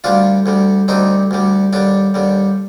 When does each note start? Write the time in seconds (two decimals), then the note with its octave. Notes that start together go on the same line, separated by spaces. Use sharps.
0.04 D2 D3 G3 D4 F4
0.46 D2 D3 G3
0.88 D2 D3 G3 C4 D#4
1.31 D2 D3 G3
1.73 D#2 D3 G3 D4
2.14 D#2 D3 G3